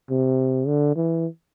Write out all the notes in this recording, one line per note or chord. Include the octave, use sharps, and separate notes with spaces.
C3
D3
E3